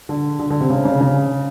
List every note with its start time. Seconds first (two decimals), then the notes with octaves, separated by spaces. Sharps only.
0.09 D3
0.39 D3
0.50 D3
0.61 C3
0.70 C#3
0.85 C#3
1.01 C#3